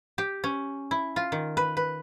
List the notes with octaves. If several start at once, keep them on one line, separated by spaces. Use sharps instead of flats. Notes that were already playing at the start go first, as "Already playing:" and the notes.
G4
C#4
E4
F4
D#3
B4
B4